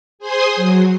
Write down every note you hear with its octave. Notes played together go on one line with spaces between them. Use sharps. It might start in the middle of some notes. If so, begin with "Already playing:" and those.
G#4 C5 G#5 C6 D#6
F#3